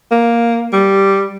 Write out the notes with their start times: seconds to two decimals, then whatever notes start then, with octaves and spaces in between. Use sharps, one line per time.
0.11 A#3
0.72 G3